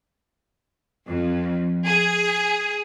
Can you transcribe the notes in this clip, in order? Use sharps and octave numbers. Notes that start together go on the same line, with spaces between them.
F2
G#4